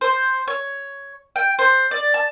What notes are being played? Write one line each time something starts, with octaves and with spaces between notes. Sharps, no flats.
C5
C#5
G5
C5
D5
A5